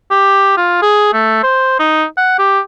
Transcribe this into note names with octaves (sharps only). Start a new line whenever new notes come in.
G4
F4
G#4
A3
C5
D#4
F#5
G4